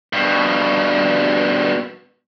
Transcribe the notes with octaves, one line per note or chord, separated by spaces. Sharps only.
G2 B2